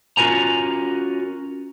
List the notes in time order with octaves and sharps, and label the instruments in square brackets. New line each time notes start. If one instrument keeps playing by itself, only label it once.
[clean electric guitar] C#4 F4 F#4 A#4 G#5 A#5